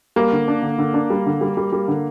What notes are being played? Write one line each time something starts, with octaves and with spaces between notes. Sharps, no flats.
G3 A#3
D3
D4
D3
D3
D4
G3
D3
G3
G3
G3
D3